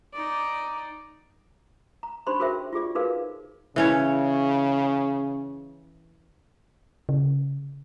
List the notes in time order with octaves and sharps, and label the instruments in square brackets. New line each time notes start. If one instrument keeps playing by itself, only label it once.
[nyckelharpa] D#4 D5
[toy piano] A#5
D4 D#4 G4 C5 B5 C6
F#4 G#4 A#4 C5 E5 G5
F4 G4 G#4 D5
D#4 F#4 G#4 A#4 B4 F5
[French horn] C#3 [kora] E3 C#4 C#5
[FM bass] C#3